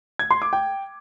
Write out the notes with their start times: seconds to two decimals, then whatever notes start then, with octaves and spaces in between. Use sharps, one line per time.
0.19 G#6
0.31 C6
0.42 D6
0.53 G5